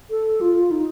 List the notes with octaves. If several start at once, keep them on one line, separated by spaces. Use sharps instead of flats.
A4
F4
D#4